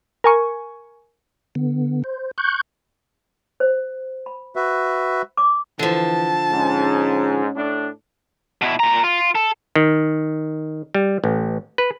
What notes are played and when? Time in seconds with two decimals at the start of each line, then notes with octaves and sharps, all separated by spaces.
0.24 A#4 G#5 C#6
1.55 D3 B3
2.04 C5
2.38 C#6 F#6 G6
3.60 C5
4.26 B5
4.56 F#4 B4 E5
5.37 D6
5.79 D3 E3 F3 A5
6.51 G#2 C#4
7.56 A2 D4
8.62 B2 E4
8.80 A#2 A#5
9.04 F4
9.35 A4
9.76 D#3
10.95 G3
11.24 A1
11.78 B4